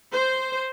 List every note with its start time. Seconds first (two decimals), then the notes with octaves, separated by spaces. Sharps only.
0.13 C5